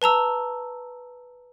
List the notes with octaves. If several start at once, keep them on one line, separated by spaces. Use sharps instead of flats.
B4 A5 A#5 E6